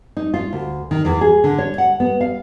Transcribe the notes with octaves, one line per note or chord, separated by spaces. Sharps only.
D#4
F4
D2
D#3
E2
G#4
D3
C#5
F#5
B3
F5